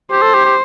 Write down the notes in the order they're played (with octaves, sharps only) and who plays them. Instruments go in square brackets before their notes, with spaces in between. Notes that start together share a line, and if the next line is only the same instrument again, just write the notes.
[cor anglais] G4 [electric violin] C5
[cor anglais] A4
G4
G4